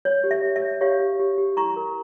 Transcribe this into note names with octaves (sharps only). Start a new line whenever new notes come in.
C#5
G4
E5
G4
E5
C#5
G4 C#5 F5
G4
G4
G4
E4 A#5 C#6
A#4